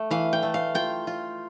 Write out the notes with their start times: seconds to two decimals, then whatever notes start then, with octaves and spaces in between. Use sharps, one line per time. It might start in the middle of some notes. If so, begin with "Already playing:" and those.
Already playing: A3
0.11 E3 F5
0.33 G5
0.43 A3
0.54 F5
0.75 F4 G5
1.07 F4